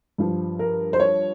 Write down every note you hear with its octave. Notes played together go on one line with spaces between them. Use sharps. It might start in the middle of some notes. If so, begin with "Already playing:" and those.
G2 F3
A#4
C5
C#5